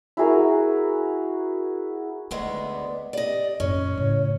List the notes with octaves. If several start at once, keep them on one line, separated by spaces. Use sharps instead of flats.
E4 F#4 G#4 A#4
D2 G#3 B3 D#4 E5
D5
G4 D5 D#5
F#2 A#2 C#4 C#5
A2 C#3